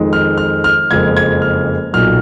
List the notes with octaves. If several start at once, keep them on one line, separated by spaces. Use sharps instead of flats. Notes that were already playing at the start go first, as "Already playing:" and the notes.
Already playing: F2 D#3 G#3
F6
F6
F6
F#1 F2 F3 G#3 G#6
G#6
F6
B1 A#2 F#3 F6